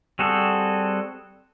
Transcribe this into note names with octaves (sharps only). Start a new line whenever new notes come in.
G3 C4 F#4 G#4 A4